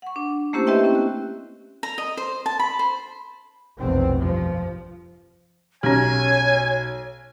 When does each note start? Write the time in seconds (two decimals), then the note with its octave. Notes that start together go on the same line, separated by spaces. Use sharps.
0.02 F#5 C#6
0.16 D4
0.53 A3 A#3 C#4 E4 G4 C5
0.67 G4 B4 D#5 E5 G5 C6
0.84 C4 C#4 E4
0.95 F#6
1.83 A#5
1.98 D#5
2.17 C5
2.46 A5
2.60 B5
2.79 C5
3.78 F1 B1 E2 C4
4.17 G2 F3
5.83 B1 C#4 G4 C#5 G#5